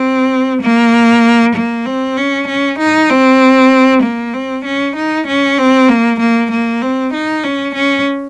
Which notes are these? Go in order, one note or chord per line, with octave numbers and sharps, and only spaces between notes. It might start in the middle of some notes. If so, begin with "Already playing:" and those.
Already playing: C4
A#3
A#3
C4
C#4
C#4
D#4
C4
A#3
C4
C#4
D#4
C#4
C4
A#3
A#3
A#3
C4
D#4
C#4
C#4